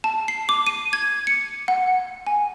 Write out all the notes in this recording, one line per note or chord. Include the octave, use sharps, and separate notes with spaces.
A5
C7
D6
D#7
G#6
C#7
F#5
G#5